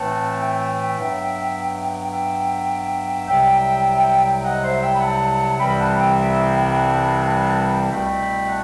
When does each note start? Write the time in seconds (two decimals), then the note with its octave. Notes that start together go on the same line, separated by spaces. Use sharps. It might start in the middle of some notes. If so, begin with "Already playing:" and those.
Already playing: A2 E3 A3 C4 F#5 A5
0.37 E5 G5
0.95 G2 F#3 B3
2.11 E5 G5
3.27 C2 C3 F#3 E5 G5
4.43 D#5 F#5
4.62 C5 E5
4.81 E5 G5
4.94 B5
5.01 F#5 A5
5.58 C2 C3 E3 G3 C4 G5 B5
5.79 F#5 A5
5.97 E5 G5
6.17 E5 G5
6.55 G5 B5
6.75 F#5 A5
7.90 C2 B2 A3 C4 G5 B5
8.48 F#5 A5